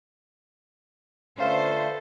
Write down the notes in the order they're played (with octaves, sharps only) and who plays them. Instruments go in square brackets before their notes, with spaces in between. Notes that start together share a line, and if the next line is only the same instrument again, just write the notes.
[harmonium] D3 A3 [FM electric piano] C#4 F4 F5 [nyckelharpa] A4 B4 [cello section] C5